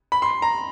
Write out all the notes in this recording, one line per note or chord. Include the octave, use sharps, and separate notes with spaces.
B5
C6
A#5